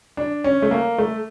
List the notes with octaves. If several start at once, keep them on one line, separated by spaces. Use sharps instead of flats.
D4
C#4
A3
A#3
A3